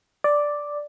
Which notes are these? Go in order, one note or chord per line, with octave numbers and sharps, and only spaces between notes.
D5